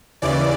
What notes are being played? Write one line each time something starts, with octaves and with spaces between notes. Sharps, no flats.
D#2 C#3 E3 D5